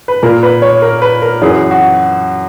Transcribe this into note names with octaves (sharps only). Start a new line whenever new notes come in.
B4
A#2 A#4
B4
C#5
A#4
B4
A#4
F#2 E3 G#4
F#4